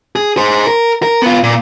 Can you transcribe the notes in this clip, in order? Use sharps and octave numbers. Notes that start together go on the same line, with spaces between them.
G#4
G#4 C5
A#4
A#4
B3 F4
A#2